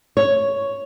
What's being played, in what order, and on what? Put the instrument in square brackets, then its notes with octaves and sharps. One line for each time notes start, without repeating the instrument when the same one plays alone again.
[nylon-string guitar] C#5